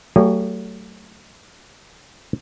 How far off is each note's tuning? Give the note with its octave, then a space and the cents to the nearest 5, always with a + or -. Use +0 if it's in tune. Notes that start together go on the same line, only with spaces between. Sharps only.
F#3 +30 A3 +20 G#4 -45